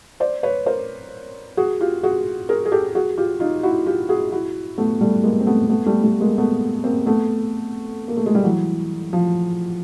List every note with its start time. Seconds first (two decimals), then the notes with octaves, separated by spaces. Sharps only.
0.20 C5 D5
0.43 B4 C#5
0.66 A#4 C5
1.57 F#4 G#4
1.81 F4 G4
2.03 F#4 G#4
2.49 G#4 A#4
2.65 G#4
2.72 G4 A4
2.95 F#4 G#4
3.17 F4 G4
3.40 D#4 F4
3.63 E4 F#4
3.87 F4 G4
4.09 F#4 G#4
4.32 E4 F#4
4.78 A3 B3
5.01 G3 A3
5.24 G#3 A#3
5.40 C4
5.47 A3 B3
5.69 A3 B3
5.86 G3 A3
6.03 G3 A3
6.21 G#3 A#3
6.38 A3 B3
6.84 A#3 C4
7.06 A3 B3
8.08 A#3
8.17 A3
8.26 G#3
8.35 G3
8.44 E3 F#3
9.13 F3